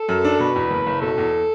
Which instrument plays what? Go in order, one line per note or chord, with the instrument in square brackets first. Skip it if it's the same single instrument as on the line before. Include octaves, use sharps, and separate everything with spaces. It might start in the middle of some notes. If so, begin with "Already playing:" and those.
Already playing: [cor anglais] A4
[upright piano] F#2
D4
[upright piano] B2 [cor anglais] B4
[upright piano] E2
F#1
F#1
[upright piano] B2 [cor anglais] A4
[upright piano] E2